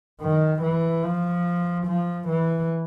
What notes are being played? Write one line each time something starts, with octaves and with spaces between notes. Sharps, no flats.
D#3
E3
F3
F3
E3